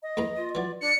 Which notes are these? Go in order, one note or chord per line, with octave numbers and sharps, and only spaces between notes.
D#5
E2 A#3 A#5
F4
E3 F#3 D5
D4 D5 C#7